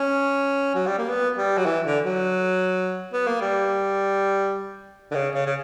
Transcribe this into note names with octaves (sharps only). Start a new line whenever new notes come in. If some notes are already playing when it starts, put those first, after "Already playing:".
Already playing: C#4
F#3
G3
A#3
B3
G3
F#3
E3
D3
F#3
B3
A#3
G3
D3
C#3
C#3
C#3